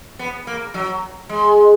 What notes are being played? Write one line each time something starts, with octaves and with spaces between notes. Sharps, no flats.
B3
A#3
F#3
G#3